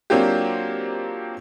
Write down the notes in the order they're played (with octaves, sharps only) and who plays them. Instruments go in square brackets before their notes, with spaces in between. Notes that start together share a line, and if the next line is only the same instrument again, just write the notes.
[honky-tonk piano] F#3 A#3 C4 D4 F4 G4